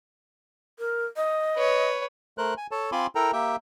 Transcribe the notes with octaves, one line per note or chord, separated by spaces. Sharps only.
A#4
D#5
B4 C#5
A3 A#4 C5 F#6
G#5
A4 C#5 A5
C4 F4 G#5 B5 C6 D6
E4 A4 A#4 G5 A#5
A#3 G4 E5 G5